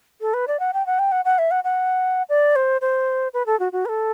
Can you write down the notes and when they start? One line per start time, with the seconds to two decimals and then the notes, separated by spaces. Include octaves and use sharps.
0.21 A4
0.34 B4
0.48 D5
0.60 F#5
0.74 G5
0.86 F#5
0.99 G5
1.12 F#5
1.25 F#5
1.39 E5
1.51 F#5
1.64 F#5
2.29 D5
2.56 C5
2.81 C5
3.34 B4
3.46 A4
3.60 F#4
3.73 F#4
3.85 B4
3.89 A4